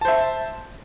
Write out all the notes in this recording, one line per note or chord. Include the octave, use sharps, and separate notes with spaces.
C5 E5 A5